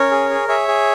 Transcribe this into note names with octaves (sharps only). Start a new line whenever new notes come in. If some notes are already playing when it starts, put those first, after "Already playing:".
Already playing: C#4 A#4 C#5
G#4
G#4
G#4 C#5 E5
G#4